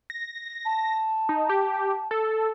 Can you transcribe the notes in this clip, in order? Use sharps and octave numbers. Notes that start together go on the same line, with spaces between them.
A#6
A5
D#4
G4
A4